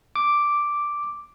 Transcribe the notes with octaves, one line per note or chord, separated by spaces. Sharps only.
D6